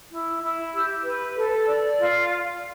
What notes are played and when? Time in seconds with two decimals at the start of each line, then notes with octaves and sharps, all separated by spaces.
0.11 E4
0.42 E4
0.73 G4
1.04 B4
1.37 A4
1.67 D5
1.98 F4